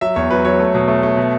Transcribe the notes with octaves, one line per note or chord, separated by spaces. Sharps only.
F#3 E5
E2 C#5
F#3 B4
F#3 C#5
A3
B2
A3
A3
B2